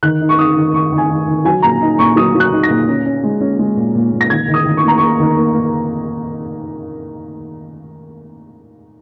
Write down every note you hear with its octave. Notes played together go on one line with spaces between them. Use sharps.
D#3 F#6
D#4
C#6
D#4 D#6
D#3
D#3 C#6
D#3
G#5
D#3
D#3
F#3 G#5
A#2 A#5
D#4
A#2 C#6
F#3 D#6
F#3
F#6
D#4
A#6
A#2
C#4
C#4
G#3
C#4
G#3
A#2
A#2
A#2
A#6
D#3 G#6
D#3
D#6
D#3
C#6
A#3 A#5
A#3 C#6
D#3
A#3
A#3